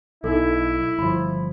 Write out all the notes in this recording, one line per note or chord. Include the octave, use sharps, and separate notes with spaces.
B1 D#4 E4 A4
G1 F3 B5